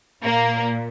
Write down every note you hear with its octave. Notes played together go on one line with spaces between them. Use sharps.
A#2 A#3